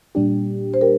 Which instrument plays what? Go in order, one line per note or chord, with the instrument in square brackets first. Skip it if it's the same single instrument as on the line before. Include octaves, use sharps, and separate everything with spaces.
[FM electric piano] A#2 G3 D4 G4
[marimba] C5
[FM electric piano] G4 [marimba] A#4